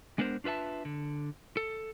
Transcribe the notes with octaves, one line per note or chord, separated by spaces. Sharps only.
G#3 B3 D4 A#4 C5
D4 F4 B4 E5 A5
D3
A4